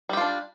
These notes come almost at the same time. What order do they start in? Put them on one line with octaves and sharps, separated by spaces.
G3 G4 F4 D4